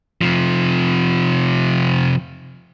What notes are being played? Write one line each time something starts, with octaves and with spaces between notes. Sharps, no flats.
C3 F3